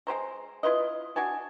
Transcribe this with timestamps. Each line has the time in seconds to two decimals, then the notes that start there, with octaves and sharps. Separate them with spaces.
0.07 G#3 G4 C5 A#5
0.63 E4 F4 B4 D#5
1.16 D4 F#4 G#5 A5